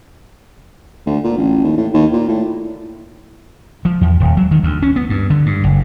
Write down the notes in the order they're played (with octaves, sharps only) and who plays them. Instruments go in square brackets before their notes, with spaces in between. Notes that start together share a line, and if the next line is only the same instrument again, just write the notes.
[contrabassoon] D2
A#2
A1
D#2
A2
D#2
A#2
A2
[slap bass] F3
E2
D#1
F#3
D#3
D2
C#4
B3
G2
D3
G2
F#1